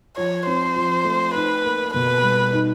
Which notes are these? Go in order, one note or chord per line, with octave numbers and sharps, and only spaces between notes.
F3 C#5
C4 C5
F3
A3
D#4 B4
A#3
B2 B4
G3
D#4